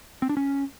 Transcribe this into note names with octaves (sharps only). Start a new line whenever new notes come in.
C4
D4
C#4